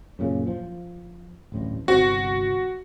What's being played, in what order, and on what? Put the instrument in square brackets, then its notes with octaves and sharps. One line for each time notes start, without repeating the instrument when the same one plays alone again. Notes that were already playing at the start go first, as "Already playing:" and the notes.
[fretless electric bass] F#2 A#2 C#3
F3
D1 A1 G2
[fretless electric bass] G1 C2 C4 [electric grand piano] F#4